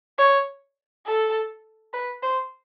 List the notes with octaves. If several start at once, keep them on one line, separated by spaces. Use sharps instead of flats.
C#5
A4
B4
C5